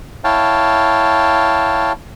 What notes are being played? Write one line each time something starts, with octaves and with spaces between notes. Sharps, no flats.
E4 C#5 F5 G5 A5